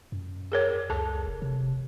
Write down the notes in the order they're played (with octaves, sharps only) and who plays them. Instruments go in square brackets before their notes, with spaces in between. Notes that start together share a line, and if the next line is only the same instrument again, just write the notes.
[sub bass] F#2
[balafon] G#4 A#4 C#5
[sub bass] C#2 [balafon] A4 A5
[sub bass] F1
C3